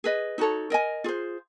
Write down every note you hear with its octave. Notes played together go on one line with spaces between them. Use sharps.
G#4 B4 D#5
D#4 F#4 A4 C#5
A#4 D#5 G#5
F4 G#4 C5